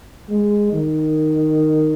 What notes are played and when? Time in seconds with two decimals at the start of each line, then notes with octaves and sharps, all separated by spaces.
0.29 G#3
0.73 D#3